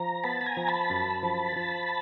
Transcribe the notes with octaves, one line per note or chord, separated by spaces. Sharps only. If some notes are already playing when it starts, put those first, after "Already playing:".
Already playing: F3 A#5
B3 A5 B5
B5
G#5 A#5
F3
A5 B5
F#2
F3
F3